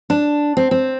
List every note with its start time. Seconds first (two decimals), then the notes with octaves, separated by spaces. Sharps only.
0.10 D4
0.57 C4
0.71 C4